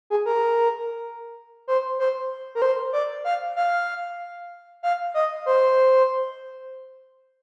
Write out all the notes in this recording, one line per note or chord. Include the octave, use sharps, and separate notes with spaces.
G#4
A#4
C5
C5
A#4
C5
D5
F5
F5
F5
D#5
C5